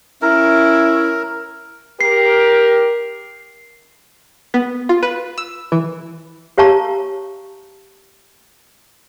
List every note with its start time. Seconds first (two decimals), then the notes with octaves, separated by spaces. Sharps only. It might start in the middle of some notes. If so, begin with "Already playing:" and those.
0.22 C#4 E4 A#4
2.01 G4 A#4 C7
4.54 B3
4.89 F4
5.03 B4
5.38 E6
5.72 E3
6.58 G4 C#5 F5 A5 A#5 C#6